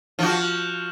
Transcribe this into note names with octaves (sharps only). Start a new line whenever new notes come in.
F3 F#4